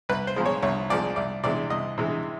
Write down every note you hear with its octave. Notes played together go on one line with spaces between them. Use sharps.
C2 B4
C5
A#2 F3 G#3
C#5
C2 C#5
A#2 F3 G#3 D5
C2 D5
C3 E3 G#3 D5
C2 D#5
C3 E3 G#3